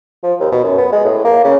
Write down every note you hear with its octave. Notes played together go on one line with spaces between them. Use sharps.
F3
D#2
B2
F#2
B3
G#3
A2
A#3
C#3